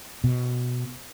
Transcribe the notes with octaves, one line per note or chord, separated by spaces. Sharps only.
B2